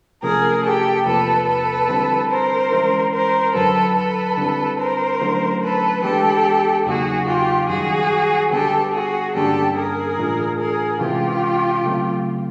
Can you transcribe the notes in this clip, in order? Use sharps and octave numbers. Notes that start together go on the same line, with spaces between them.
C3 F3 A3 C#4 G#4 A#4
G4 A4
E2 C3 F3 A#3 A4 B4
A4 B4
D3 G3 C4 E4
A#4 C5
E3 G#3 C#4 E4
A#4 C5
F#2 D3 F#3 A4 B4
A4 B4
D3 G3 C4 E4
A#4 C5
D3 F#3 A3 C#4 E4
A4 B4
E3 G#3 B3 D4 G4 A4
E2 C#3 F#3 A#3 D#4 F#4 G#4
F4 G4
F#2 D#3 G3 F#4 G#4
D3 G3 B3 G4 A4
F#4 G#4
G2 D3 G3 A#3 C#4 G4 A4
G#4 A#4
A2 E3 A3 D4 F4
G#4 A#4
C3 E3 G#3 C#4 E4 F4 G4
C#3 F#3 A3 C4